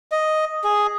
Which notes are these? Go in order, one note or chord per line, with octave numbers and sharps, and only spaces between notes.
D#5
G#4